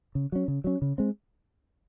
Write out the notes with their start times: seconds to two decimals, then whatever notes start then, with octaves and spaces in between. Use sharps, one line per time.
0.15 C#3
0.32 F#3 C#4
0.48 C#3
0.64 F#3 C#4
0.82 C#3
0.98 G#3 C4